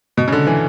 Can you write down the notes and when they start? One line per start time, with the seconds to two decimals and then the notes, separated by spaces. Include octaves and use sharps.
0.17 B2
0.28 C#3
0.32 D3
0.47 E3